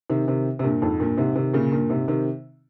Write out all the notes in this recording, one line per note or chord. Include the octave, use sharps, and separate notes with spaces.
C3 D#3
C3 D#3
C3
G2 A#2
F2 G#2
G2 A#2
G#2 C3
C3 D#3
A#2 C#3
G2 A#2
G#2 C3
C3 D#3